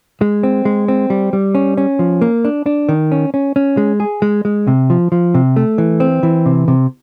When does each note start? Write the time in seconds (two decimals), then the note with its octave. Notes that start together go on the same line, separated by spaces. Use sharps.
0.21 G#3
0.43 C4
0.65 G#3
0.88 C4
1.10 G3
1.33 G3
1.55 C#4
1.77 C#4
1.99 F3
2.22 A#3
2.45 D4
2.66 D4
2.89 D#3
3.12 C#4
3.34 C#4
3.56 C#4
3.77 G#3
4.00 G#4
4.22 G#3
4.45 G#3
4.67 C3
4.90 F3
5.12 F3
5.34 C3
5.56 A3
5.78 E3
6.00 C4
6.23 E3
6.46 C3
6.68 C3